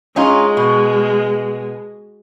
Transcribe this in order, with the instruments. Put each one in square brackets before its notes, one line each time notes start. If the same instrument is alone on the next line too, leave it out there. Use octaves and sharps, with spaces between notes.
[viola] G#3 [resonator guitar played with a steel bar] C#4 D#4 F4
[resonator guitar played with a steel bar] B2